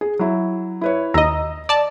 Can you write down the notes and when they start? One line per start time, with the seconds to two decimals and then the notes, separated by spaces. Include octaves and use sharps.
0.01 G#4
0.19 F#3 E4
0.81 E4 B4 C#5
1.14 D#2 D#5 A#5 E6 A#6
1.69 D5 A5